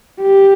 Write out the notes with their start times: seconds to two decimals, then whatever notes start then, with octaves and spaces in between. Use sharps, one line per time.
0.21 G4